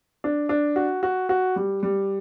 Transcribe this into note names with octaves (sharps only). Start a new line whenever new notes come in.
D4
D4
F#4
F#4
F#4
G3
G3